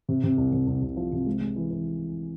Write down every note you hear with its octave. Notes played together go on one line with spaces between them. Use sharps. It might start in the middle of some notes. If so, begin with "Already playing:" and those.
C3
C3
C2
C3
C2
C2
F3
C3
G#3
G#3
E3
E3